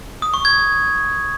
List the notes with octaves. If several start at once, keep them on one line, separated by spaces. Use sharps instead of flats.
D#6
C#6
G#6